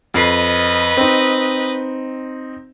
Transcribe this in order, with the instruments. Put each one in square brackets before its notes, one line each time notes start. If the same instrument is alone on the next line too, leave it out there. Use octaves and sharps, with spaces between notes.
[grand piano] F2 C7 [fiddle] B4 D#5
[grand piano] C4 D#4